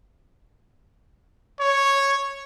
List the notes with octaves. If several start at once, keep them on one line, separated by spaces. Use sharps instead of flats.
C#5